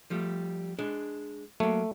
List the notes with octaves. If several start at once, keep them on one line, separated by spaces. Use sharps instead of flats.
F3 G3 A3
G#3 D4
F#3 A3 A#3